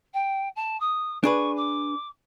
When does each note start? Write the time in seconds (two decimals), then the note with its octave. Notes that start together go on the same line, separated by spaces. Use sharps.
0.14 G5
0.55 A5
0.80 D#6
1.24 D4 G#4 B4 C#6
1.56 D6